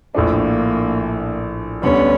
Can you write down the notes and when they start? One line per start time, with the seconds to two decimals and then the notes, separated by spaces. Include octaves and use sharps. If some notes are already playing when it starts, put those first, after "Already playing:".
0.15 A#1 A2 F3 A3 A#3 D4
1.82 D2 D3 G3 B3 C#4